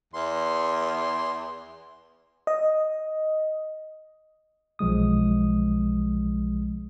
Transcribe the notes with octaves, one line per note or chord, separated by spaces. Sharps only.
E2 C6
D#5
B1 F3 G#3 D#6